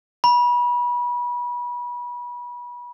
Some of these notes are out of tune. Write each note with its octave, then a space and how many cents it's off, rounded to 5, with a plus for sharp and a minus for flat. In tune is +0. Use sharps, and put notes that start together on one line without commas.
B5 -30